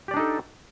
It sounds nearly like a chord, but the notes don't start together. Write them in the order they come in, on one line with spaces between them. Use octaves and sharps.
G4 D5 D4 D#4 A4